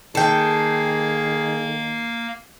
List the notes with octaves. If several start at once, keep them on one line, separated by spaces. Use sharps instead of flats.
D#3 A#3 G#4 A4 F5 G5